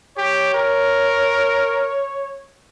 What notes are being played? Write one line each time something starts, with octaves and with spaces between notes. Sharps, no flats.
G4 C#5
A#4